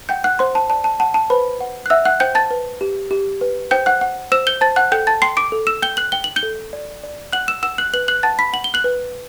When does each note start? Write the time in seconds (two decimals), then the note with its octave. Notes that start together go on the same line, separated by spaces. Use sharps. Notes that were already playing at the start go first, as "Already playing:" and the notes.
0.09 F#5 G5 G6
0.24 F#5 F#6
0.39 C5 F#5 C6
0.55 A5
0.69 D5 A5
0.84 A5
1.00 F#5 A5
1.14 A5
1.30 B4 C5 B5
1.61 F#5
1.86 F#6
1.90 E5 F#5 E6
2.05 F#5 F#6
2.20 C5 G5 G6
2.35 A5 A6
2.51 B4
2.81 G4
3.11 G4
3.41 B4
3.71 C5 G5 G6
3.86 F#5 F#6
4.01 F#5
4.32 C5 E6 E7
4.47 G6 G7
4.61 C5 A5 A6
4.76 F#5 F#6
4.92 A4 G5 G6
5.07 A5 A6
5.22 G5 C6 C7
5.37 D6 D7
5.52 A4
5.67 E6 E7
5.82 G5 G6 G7
5.97 F#6 F#7
6.12 G5 G7
6.24 F#7
6.36 G6 G7
6.43 A4
6.73 D5
7.03 D5
7.33 F#5 F#6 F#7
7.48 E6 E7
7.63 F#5 E6 E7
7.78 F#6 F#7
7.93 B4 F#6 F#7
8.08 F#6 F#7
8.23 F#5 A5 A6
8.39 B5 B6
8.53 F#5 F#7
8.64 G7
8.74 F#6 F#7
8.84 B4